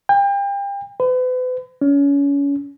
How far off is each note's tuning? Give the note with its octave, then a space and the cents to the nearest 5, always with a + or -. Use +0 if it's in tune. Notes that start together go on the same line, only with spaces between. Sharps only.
G5 +35
B4 +40
C#4 +30